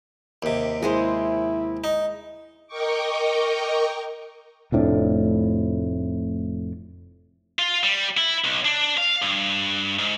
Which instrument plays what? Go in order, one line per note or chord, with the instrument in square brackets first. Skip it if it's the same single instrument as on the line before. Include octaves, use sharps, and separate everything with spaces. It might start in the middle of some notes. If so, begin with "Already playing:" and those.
[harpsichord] D#2 C3
[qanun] G#3 G#4 C5 [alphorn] E4
[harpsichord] D#4
[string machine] A#4 D#5 G5 C#6 D6
[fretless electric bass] F1 F2 A2 D4
[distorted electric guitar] F4
G3
E4
B1
D4
F5
G2
G#2